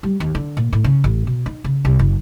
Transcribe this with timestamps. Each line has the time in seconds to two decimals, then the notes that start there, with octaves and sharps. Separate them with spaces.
0.03 G3
0.20 D#2
0.35 D3
0.57 A#2
0.73 A2
0.84 C#3
1.04 A1
1.27 B2
1.46 D#4
1.64 C#3
1.85 C2
1.99 F#1